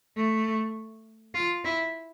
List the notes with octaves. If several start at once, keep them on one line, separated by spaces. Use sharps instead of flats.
A3
F4
E4